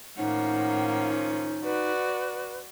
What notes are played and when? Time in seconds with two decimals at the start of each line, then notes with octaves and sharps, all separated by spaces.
0.17 A2 D#3 F3 A#3 C#4 D#4 F#5
1.64 F#4 B4 D5